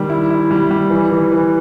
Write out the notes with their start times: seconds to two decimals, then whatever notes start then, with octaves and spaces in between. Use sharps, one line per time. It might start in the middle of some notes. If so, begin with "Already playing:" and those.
Already playing: D#3 G3
0.10 E4
0.30 E4
0.51 G3
0.71 G3
0.90 E3
1.11 E3
1.32 E3